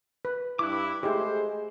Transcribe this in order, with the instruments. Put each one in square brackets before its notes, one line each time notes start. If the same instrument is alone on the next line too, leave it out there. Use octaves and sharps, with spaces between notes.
[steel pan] B4
[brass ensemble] G2 E4 [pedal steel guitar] D6 F#6
[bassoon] G#3 [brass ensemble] A3 G#4 C5 [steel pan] E4 G4